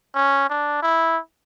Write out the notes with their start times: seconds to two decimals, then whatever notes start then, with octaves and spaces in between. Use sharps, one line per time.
0.15 C#4
0.49 D4
0.83 E4